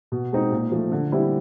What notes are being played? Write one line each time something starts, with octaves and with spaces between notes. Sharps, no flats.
B2
G#3 C4 D#4
A#2
F3 A3
D3
G3 C4 E4